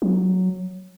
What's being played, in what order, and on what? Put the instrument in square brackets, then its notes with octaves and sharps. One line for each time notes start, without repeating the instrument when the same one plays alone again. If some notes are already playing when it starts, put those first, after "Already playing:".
[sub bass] F#3